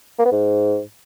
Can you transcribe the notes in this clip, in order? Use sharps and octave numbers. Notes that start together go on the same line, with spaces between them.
A#3
B3
G#2